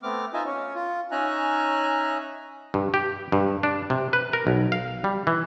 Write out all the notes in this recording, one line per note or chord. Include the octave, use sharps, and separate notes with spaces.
A3 B3 C4 D6 F6
D#4 F4 D#5 E5 G#5
C#4 C#5
F4
C#4 D#4 E5 G#5 A#5 F#6
G2
G4
G2
D4
C3
B4
A#4
B1
F5
G3
E3